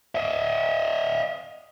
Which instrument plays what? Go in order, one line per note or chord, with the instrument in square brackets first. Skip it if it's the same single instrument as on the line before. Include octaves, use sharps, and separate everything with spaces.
[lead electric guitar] D#5 E5